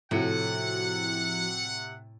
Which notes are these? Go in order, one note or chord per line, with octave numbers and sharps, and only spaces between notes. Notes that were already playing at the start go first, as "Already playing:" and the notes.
A2 C3 F3 E4 F#4 F#5 C#7